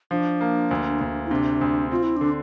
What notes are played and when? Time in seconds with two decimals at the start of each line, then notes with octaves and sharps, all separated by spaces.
0.11 F3 D4
0.41 A#3
0.71 D2
1.01 D2
1.25 E4
1.31 C3 D4
1.61 D2
1.91 C4 F4
2.03 E4
2.17 D3 D4